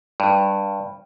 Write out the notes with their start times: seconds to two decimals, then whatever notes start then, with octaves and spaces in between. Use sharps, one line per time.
0.20 G2